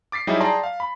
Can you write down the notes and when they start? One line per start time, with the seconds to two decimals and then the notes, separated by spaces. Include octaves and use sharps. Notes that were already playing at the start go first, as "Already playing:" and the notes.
0.12 D6 A6 B6 C7
0.27 F#3 G3 D#4 E4 G4 G#4
0.40 G#4 D5 G5 A5 A#5 C6
0.63 F5
0.80 B5